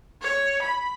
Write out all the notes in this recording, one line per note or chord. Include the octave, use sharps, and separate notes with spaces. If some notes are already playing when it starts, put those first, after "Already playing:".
C#5
B5